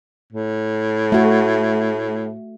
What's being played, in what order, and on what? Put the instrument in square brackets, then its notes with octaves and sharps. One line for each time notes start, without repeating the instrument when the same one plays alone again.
[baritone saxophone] A2
[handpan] A3 F#4